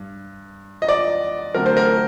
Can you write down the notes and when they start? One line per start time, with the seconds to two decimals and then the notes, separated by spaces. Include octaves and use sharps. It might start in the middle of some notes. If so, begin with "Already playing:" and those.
Already playing: G2
0.82 D#5
0.89 D5
1.54 D3 F#3 A3 C4 A#4
1.66 C5
1.77 A#4